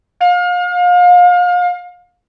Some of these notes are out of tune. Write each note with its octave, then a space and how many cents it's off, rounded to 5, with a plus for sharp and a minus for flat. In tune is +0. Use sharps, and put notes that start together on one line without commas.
F5 +35